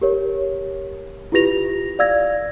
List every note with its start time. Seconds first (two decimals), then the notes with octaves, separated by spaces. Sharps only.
0.01 G4 A#4 C#5
1.32 E4 F4 G4 B4 A#6 F7
1.99 D5 F5 E6 G#6 A#6